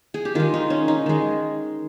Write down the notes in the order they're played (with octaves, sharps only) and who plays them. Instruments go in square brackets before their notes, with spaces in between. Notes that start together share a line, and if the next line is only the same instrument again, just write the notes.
[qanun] G#4
G4
D#3 G#3 F4
D#4
C#4
D#4
D#3 G#3